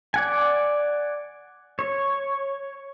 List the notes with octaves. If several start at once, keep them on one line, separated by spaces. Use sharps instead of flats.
D5 F#5 G#5
C#5